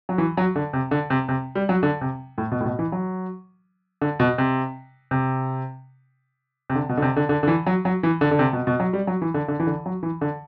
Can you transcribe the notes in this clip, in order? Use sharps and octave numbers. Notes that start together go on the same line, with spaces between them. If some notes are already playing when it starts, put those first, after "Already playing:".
F#3
E3
F#3
D3
C3
D3
C3
C3
G3
F#3
D3
C3
A2
B2
A2
B2
E3
F#3
D3
B2
C3
C3
C3
D3
B2
D3
C3
D3
D3
D3
E3
F#3
F#3
E3
D3
D3
C3
B2
B2
F#3
G3
F#3
E3
D3
D3
E3
D3
F#3
E3
D3